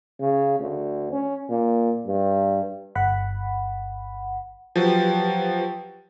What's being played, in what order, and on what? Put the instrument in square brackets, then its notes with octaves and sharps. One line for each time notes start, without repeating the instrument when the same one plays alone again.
[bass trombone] C#3
D2
C#4
A#2
G2
[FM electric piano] G1 F#5 B5
[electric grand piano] F3 F#3 [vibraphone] G4 B4 G5